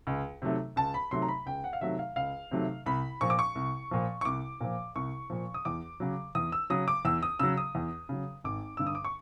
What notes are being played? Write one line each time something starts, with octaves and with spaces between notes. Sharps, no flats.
C#2
C3 D#3 F#3 A3
C#2 A5
B5
C3 D#3 F#3 A3 C6
A#5
B5
C#2 G5
F#5
F5
C3 D#3 F#3 A3 E5
F5
C#2 F5
C3 D#3 F#3 A3
C2 B5
A#2 F3 C#6
D6
C#6
C2
A#2 F3
C#6
C2 D6
A#2 F3
C2 C#6
A#2 F3
D#6
E2 D6
C#3 F#3
E2 D#6
E6
C#3 F#3 D#6
D6
E2 E6
D#6
C#3 F#3 E6
D#6
E2
C#3 F#3
G#1 D6
G2 D3 E6
D#6
D6
C#6